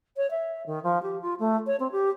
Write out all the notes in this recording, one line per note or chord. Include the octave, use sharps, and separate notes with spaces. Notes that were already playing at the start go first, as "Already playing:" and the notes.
C#5
E5
D#3
F3
G4
F4
A3
C#5
C4
G4